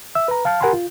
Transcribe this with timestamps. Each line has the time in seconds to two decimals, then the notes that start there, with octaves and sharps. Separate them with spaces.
0.15 E5 E6
0.28 B4 A#5
0.45 F5 A5 F6
0.61 G4 A#4 F#5 G#5 B5 C6
0.73 F4